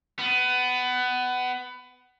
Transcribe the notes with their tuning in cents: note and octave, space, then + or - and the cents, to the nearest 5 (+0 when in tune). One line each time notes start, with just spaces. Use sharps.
B3 +20